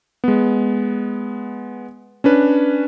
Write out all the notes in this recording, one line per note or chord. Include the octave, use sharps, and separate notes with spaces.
G#3 B3
C#4 D4 B4